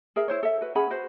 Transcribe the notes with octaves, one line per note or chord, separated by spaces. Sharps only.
G#4 A#4 E5
E4 C5 C#5
A4 E5
F#4 B4
C#4 G#4 F#5 B5
F#4 B4 C5